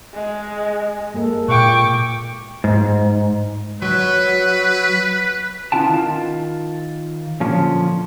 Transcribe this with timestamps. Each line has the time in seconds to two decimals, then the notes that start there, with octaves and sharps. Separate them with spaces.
0.14 G#3
1.14 G#3 A#3 A4
1.48 A#2 G5 C#6 D6
2.64 G#2
3.82 F#3 B4
5.72 B3 C#4 E4 F4 G5 A5
5.90 D#3 F4
7.40 A#2 D3 F3 C#4